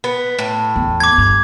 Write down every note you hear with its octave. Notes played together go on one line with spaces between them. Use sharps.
B3
A2
E2
D6 G#6
G2